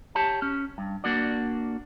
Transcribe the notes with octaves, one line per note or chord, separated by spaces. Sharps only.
G4 C#5 A5
C#4
G2
A#3 D4 F#4 D5